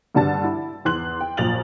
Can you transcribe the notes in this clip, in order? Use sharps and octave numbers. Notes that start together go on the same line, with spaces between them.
G2 D3 G3 A5 A6
E4
E2 C6 F#6 F#7
G5
A#1 F#2 A6 F7 F#7